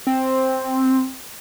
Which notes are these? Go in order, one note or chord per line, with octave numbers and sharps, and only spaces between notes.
C4